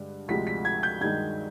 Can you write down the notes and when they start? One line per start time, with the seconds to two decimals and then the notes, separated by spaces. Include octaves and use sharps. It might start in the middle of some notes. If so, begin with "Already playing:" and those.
Already playing: G2 D3 G#3
0.28 D2 C3 F3 G#3 B6
0.47 B6
0.65 G#6
0.83 G6
1.01 G2 D#3 G#3 G#6